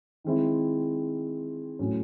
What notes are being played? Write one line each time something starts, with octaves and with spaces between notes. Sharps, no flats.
D#3 G#3 C4 E4
A2 F#3 C#4